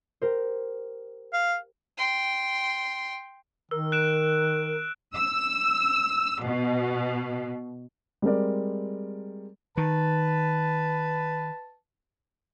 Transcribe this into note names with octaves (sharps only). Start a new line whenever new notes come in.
G4 A#4 C5
F5
G5 C6
D#3 A#4 E6
F#6 D7 E7
E6
B2
G3 G#3 C4 A#4 D5
D#3 B4 A5